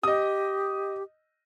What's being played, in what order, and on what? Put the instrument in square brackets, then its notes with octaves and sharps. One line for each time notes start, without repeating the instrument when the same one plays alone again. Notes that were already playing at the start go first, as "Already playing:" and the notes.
[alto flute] G4 [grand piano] D#5 D#6